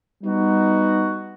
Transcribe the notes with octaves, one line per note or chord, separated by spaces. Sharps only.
G3 B3 D#4 F#4